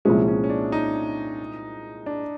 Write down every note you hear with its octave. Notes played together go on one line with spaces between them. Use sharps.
C2 A#2 F3 G#3 C#4
C#4
C#4
D4
D#4
D4